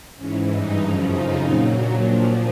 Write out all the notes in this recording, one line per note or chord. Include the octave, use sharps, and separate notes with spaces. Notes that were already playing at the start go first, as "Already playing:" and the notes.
G#2 E3 C#4
G2 E3 D#4
F#2 C#3 F3
F2 C#3 F3 D#4
A#2 F#3
A#2 F#3 D4
A#2 F3 D4